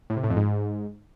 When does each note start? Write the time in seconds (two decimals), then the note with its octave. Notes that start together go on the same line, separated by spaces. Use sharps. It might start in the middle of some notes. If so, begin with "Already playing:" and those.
0.10 A2
0.17 C3
0.23 A2
0.30 F2
0.37 G#2